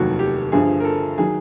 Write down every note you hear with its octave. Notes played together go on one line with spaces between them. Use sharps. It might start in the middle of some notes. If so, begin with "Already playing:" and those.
Already playing: F1 D#2 D#3 F#3 F#4
G4
G1 G2 D3 F3 G#4
A#4
A4
D#3 F#3 G#4